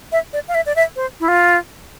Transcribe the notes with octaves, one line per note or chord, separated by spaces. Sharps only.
E5
D5
F5
E5
D5
E5
C5
E4
F4